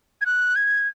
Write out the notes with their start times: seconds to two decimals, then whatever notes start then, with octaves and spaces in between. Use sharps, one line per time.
0.21 G#6
0.26 F#6
0.56 G#6